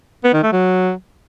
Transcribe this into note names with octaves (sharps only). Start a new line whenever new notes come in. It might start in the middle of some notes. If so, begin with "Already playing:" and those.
B3
D#3
A3
F#3